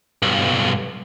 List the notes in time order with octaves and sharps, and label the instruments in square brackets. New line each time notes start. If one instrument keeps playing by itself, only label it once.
[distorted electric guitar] B1 G2